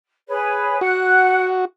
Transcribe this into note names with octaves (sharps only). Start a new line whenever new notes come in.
G#4 B4 C#5
F#4 F#5 F#6